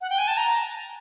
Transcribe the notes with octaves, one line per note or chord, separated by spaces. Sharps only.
F#5
G5
G#5
A5
A#5